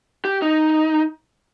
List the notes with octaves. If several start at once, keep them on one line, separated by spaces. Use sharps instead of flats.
G4
D#4